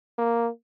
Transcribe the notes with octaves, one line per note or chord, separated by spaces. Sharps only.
A#3